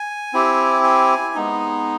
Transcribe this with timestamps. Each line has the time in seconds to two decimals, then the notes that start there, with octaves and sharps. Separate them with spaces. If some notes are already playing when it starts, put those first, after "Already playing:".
Already playing: G#5
0.34 C4 E4 G4
0.84 G#5
1.35 G#3 B3 D#4